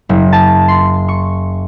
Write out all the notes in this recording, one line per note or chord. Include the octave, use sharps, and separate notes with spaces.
F#1
A5
C6
C#6